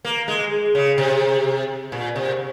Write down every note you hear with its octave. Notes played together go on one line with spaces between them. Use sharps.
A#3
G#3
C#3
C3
A#2
C3